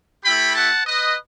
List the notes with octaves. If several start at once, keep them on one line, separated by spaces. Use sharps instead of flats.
A3 E4 G4 G5 B5
F#5 A5
B4 D#5